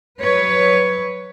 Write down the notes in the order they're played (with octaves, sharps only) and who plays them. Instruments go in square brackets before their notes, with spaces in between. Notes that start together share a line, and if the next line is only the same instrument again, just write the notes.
[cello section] F#3 B4 C#5